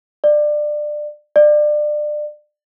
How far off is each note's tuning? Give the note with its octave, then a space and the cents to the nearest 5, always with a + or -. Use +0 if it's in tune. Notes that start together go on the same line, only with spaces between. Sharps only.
D5 +20
D5 +25